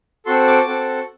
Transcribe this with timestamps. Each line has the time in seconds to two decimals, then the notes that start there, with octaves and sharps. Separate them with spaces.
0.26 C4 F#4 A4 C6
0.47 D6
0.67 C4 F#4 A4